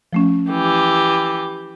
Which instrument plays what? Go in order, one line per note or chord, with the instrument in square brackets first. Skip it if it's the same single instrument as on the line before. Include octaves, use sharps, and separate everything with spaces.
[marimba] F3 A3 C#4
[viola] E3 G4